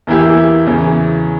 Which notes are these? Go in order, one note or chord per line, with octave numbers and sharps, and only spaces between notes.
E2 E3 A#3 E4 G4
E2 C#3 E3